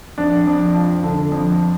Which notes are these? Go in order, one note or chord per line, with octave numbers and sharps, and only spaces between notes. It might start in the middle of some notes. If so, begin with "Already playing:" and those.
F2 D4
F2
F3
D3
F2